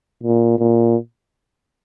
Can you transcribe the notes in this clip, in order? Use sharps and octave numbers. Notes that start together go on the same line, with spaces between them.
A#2
A#2